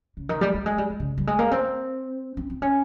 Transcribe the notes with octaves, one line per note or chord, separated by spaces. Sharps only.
C#3
D#3
G3
G3
G#3
G3
G#3
C#3
G3
G#3
A#3
C4
C4
C4
C#4